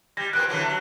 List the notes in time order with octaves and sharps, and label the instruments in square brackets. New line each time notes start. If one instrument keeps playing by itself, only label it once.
[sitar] G3 [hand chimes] G#6 A#6
[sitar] A#2 B3 C4 [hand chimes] F#6 D7
[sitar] D3 E3 F#3
F#3